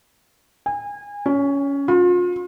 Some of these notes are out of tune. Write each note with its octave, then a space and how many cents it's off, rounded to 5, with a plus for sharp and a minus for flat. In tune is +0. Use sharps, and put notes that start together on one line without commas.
G#5 -30
C#4 +15
F4 +35